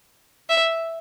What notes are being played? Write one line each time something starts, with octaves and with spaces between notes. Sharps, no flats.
E5